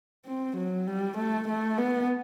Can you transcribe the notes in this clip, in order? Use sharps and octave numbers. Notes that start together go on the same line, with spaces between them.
C4
F#3
G3
A3
A3
B3